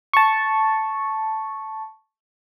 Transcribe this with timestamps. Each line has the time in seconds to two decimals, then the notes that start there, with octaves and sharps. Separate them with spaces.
0.13 A5 C#6